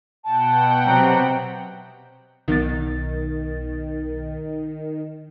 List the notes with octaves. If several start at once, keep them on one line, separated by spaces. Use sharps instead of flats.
B2 F#5 G5 A5
C3 F#3 A#5
B1 B2 D#3 A6